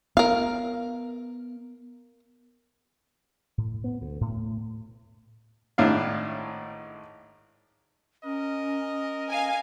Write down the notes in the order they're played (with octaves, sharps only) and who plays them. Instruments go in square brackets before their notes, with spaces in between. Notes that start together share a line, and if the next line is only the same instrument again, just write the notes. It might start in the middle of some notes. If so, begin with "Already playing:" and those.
[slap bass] B3 [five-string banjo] A#4 F5
[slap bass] A2
B3
D2
A2
[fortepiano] G#1 A2 D4 E4 F5
[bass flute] C#4 [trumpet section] A#4 D#5
[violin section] F5 G#5